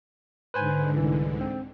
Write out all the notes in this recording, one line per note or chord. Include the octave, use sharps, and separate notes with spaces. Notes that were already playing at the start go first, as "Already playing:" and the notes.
G#2 D3 B4 C5 G#5
C2 E3
C4